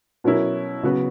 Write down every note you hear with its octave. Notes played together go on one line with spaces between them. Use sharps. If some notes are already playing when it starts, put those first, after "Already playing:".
B2 F#3 C#4 E4 A#4
C#3 F#3 B3 F#4 B4